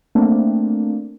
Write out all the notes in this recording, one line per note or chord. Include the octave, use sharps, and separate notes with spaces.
A3 A#3 C4 D4